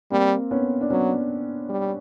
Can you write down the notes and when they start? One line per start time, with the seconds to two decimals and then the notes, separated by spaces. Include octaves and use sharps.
0.11 G3 A#3 C4
0.51 B3 C#4
0.81 D4
0.90 F#3 B3 C#4
1.70 G3